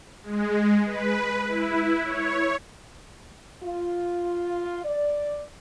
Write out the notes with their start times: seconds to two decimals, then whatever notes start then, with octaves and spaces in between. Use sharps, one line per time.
0.23 G#3
0.86 B4
1.47 E4
2.04 C#5
3.63 F4
4.84 D5